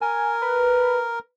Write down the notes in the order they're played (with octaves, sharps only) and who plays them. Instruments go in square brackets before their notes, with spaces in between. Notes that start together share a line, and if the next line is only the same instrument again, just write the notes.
[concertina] A#4 [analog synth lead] G#5
[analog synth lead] B4